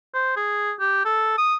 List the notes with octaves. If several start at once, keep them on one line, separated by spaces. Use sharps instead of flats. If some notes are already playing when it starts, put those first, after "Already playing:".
C5
G#4
G4
A4
D#6